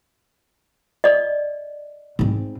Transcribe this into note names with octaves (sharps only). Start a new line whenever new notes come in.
D5 D#5
G#2 C4